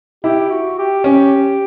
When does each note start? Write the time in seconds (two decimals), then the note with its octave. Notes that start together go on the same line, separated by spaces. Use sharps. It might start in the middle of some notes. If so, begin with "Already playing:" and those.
0.24 E4 G4
0.51 F#4
0.79 G4
1.04 C#4 G4